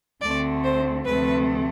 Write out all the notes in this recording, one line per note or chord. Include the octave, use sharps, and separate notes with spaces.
D2 D3 A3 C4 D5
C5
D2 C3 F3 A3 C4 B4